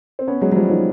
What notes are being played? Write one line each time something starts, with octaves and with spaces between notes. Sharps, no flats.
C4
B3 C#4
F#3 G#3
F#3
F3 G3
D#3 F3